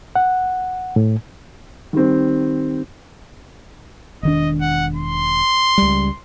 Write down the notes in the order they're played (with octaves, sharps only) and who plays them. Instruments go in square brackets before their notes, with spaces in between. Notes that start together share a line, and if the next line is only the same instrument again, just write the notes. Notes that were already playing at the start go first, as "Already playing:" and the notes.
[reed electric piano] F#5
A2
[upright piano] D#3 G3 C4
[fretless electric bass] E1 D#3 D4 [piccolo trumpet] D#5
[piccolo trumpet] F#5
C6
[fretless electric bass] C#2 G3